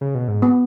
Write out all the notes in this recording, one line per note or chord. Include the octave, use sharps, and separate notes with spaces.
C#3
B2
G#2
B3